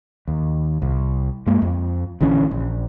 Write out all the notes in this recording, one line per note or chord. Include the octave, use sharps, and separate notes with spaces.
D#2
C2
G2 G#3 A#3
F2
A#1 D3 E3 C#4
A#1